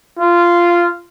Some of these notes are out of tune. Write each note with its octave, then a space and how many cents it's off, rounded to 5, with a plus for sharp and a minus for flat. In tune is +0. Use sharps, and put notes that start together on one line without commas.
F4 -10